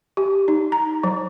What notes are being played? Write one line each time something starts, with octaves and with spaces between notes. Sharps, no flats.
G4
D#4
A#5
F#3